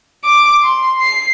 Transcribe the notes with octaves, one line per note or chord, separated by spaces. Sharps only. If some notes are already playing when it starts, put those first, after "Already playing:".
D6
C6
C7